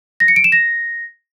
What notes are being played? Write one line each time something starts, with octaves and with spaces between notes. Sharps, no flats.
A#6
C#7
D7
E7
A#6